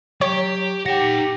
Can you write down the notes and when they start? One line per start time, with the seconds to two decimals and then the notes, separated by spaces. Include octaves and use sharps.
0.21 F#3 G4 C#5
0.86 D#4 G4 F#5 G5 A#6